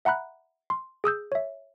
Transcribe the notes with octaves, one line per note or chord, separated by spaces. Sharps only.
E5 F#5 A#5 B5 F#6
C6
G#4 D#6 E6 G6
C#5 E5